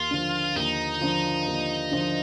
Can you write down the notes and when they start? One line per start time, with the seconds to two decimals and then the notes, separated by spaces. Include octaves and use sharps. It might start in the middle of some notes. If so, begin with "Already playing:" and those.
Already playing: D#2 F4
0.11 D3 F3
0.56 D#2 D#4
1.01 D3 F3
1.47 D#2
1.91 D3 F3